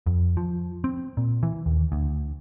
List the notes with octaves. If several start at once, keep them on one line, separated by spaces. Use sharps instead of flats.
F2
F3
C4
A#2
E3
D#2
D2